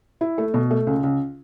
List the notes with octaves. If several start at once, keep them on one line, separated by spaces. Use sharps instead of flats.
E4
A3
B2
A3
C#2
C#2